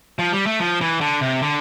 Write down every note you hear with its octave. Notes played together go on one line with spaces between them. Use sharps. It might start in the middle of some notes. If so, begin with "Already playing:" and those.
F3
G3
A3
F3
E3
D3
C3
D3